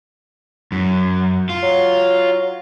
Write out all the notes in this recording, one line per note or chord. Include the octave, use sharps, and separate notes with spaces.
F#2
F4
F#3